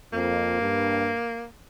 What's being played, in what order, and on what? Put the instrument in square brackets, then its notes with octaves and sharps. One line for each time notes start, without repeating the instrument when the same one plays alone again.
[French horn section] F2 [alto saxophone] A#3
[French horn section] G2